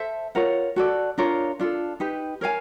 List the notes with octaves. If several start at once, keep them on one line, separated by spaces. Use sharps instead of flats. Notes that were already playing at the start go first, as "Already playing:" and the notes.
Already playing: A4 C5 E5
F4 A#4 C#5 F#5
F#4 A4 D5
D4 F4 A#4 C#5
D4 F4 A4
D#4 G4 B4
A#4 C#5 F5 G#5